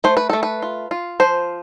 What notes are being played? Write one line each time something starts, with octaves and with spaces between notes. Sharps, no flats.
A3 C5
B4
A3 A4
B4
F4
F4
F3 C5